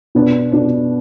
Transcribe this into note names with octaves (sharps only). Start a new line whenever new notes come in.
B2 B3 D4
B2 B3 D4